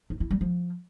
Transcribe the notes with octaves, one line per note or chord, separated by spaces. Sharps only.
D#4
E4
G3
F3